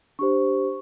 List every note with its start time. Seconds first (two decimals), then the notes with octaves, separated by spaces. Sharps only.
0.19 D4 G4 C5 C#6